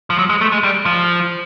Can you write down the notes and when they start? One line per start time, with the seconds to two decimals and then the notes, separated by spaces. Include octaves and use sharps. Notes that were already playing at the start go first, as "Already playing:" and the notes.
0.10 F3
0.19 F#3
0.30 G#3
0.41 A3
0.52 G#3
0.63 G3
0.85 F3